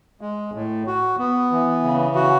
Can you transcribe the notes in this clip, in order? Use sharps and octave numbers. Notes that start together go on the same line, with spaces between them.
G#3
A2
F#4
B3
E3
C#3
F#4